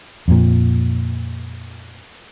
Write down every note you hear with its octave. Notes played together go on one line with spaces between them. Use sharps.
F2 A#2